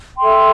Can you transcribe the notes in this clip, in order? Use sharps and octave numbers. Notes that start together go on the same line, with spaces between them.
A4 E5 G5 C6